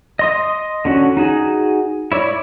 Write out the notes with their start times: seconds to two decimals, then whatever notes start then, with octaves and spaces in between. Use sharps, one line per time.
0.19 D#5 C6 D#6
0.85 D3 C#4 F#4
1.17 D#4 F#4 G#4
2.12 E4 C#5 D5